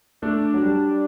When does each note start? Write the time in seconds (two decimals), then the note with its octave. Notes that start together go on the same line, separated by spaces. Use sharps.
0.22 A3 D4
0.54 F#3
0.62 G3